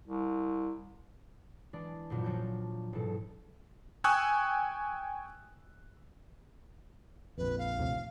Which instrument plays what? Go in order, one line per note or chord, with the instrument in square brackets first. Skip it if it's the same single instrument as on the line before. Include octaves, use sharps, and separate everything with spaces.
[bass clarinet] C2
[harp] E3 G#3 D4 D5
G#1 F#2 A#2 F#3
F3 F#3 D4 G6
E1 G#2 A4
[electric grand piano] G5 G#5 C#6 D#6 E6 F#6
[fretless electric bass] A#1 F2 [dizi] B4
[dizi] F5
[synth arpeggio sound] D#2 A2 C3